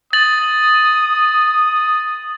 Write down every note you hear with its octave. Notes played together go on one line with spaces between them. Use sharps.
D#6 A6 F#7